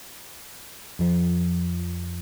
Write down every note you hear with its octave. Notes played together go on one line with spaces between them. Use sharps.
F2 F3